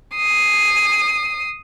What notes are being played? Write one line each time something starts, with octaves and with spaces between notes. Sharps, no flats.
D#6 C7